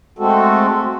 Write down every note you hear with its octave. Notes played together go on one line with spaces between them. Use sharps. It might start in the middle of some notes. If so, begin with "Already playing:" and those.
G#3 A3 C4 F#4 A4